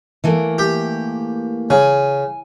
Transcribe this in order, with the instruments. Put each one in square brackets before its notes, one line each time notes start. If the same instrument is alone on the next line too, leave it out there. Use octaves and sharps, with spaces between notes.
[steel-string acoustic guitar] E3 A3 A#3
[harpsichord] G4
[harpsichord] C#3 [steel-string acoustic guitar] G#5